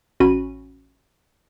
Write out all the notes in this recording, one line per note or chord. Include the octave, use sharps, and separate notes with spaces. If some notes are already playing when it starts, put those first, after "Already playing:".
A1 C#4 F#4 B5 D#7